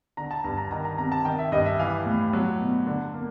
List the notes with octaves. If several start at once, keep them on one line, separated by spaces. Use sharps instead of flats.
D3 A#5
A5
G2 A#5
A#5
D#3 A#5
A#5
C3 A#5
A5
D#3 G5
E5
G2 D#5
E5
E3 F5
A2
F#3
B2
D3
A#3